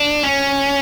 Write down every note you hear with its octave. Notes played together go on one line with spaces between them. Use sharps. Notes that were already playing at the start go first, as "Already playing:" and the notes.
Already playing: D4
C#4